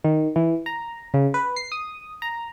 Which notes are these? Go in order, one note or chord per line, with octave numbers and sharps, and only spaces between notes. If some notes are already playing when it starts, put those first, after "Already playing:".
D#3
E3
A#5
C#3
B4
C7
D#6
A#5